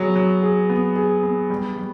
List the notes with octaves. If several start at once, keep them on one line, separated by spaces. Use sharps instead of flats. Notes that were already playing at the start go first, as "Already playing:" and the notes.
Already playing: F#3 B3 G#4
F#3
G#4
B3
G#4
B3
G3
G3